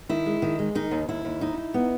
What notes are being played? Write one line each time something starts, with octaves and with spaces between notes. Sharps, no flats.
D#3 E4
G#3
D#3
G#3
D#3 D#4
D#2
D#2 E4
D#2
D#4
D#4
B3